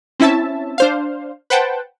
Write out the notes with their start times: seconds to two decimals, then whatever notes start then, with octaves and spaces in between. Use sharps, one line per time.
0.20 C4 C#4 E4 E5 A5
0.78 D4 C5 F5
1.50 B4 C5 F#5 G5 A5